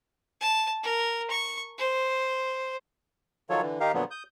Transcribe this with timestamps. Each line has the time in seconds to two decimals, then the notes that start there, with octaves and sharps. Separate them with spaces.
0.40 A5
0.83 A#4
1.30 C#6
1.78 C5
3.50 D#3 F3 F#3 F4 A4 C#5
3.62 D3 E3
3.80 D#3 D#4 G4 A#4 F5
3.94 A#2 D3 F3 F#3 B3
4.11 D#6 G6